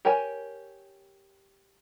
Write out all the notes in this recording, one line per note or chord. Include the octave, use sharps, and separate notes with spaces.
G4 A#4 C#5 G5 G#5